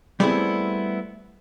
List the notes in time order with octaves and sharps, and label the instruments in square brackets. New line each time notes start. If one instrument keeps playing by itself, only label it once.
[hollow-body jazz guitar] G3 A3 B3 C4 E4 G#4